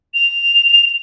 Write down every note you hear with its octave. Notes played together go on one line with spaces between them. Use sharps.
F7